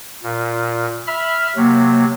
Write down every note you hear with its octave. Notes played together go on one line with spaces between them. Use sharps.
A#2
E5 B5 F6
C3 F#3 A#3